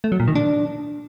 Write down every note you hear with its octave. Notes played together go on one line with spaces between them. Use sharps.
A3
F#3
A#2
D#3
D4